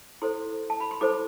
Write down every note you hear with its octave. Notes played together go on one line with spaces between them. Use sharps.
E4 A4 C5 C6
A5
B5
C6
E4 A4 C5 D6